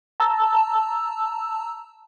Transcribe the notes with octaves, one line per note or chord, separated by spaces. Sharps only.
A5 A#5 E6